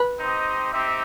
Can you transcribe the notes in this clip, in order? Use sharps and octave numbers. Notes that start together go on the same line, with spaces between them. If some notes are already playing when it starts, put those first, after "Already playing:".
Already playing: B4
C4 D#4 G4 C5 D#5
C4 D#4 G4 C5 E5